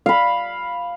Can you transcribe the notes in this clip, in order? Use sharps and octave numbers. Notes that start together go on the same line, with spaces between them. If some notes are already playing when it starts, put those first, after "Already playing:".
F5 B5